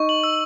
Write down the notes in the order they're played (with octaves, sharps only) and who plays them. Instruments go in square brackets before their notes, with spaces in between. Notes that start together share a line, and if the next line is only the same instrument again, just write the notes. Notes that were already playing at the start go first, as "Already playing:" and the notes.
Already playing: [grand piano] D#4 [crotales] C#6
[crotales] F#7
E6